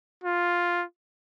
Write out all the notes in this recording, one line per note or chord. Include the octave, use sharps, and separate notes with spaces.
F4